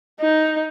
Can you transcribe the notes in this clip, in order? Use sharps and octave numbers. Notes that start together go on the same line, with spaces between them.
D#4